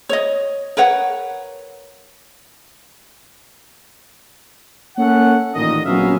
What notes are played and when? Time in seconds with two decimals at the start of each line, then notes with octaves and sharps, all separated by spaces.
0.09 C#5 D#5
0.77 A#4 B4 C#5 F#5
4.97 A#3 C#4 A4 F#5
5.54 A1 A#2 D#3 D#4 D#5
5.85 A#1 F#3 B3 C#4 E5 F5